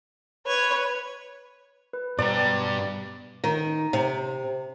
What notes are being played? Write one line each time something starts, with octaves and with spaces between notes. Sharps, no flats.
B4 C#5
B4
G2 B2 G4 D5 E5 A#5
D#3
C3